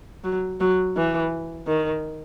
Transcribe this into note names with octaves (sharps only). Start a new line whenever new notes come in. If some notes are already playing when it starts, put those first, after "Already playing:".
F#3
F#3
E3
D#3